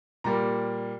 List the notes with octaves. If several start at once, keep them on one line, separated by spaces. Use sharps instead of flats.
A#2 G3 A#3 A#5